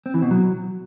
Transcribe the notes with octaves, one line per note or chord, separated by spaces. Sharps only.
C4
E3
B2
F#3